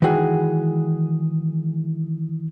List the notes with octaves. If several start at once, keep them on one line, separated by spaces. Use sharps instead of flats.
D#3 E3 G#3 F#4 G#4